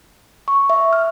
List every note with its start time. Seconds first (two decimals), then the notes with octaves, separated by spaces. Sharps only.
0.48 C#6
0.70 E5
0.93 F6